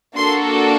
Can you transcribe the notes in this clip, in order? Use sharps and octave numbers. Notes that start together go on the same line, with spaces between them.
A#3 D4 F#4 A4 C6